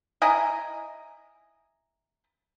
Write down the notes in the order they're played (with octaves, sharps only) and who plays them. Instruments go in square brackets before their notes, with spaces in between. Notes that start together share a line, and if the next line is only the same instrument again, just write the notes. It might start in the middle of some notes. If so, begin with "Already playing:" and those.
[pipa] E4 D#5 G#5 A#5